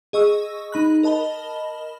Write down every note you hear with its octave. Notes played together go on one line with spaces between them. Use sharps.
G#4 D#5 C#6 E6
D#4 B5 F#6
A#4 D#5 A5 B5 G7